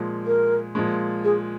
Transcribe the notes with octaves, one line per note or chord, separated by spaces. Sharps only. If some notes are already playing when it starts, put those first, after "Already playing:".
Already playing: A#2 F3 G#3
A#4
A#2 F3 G#3
G#4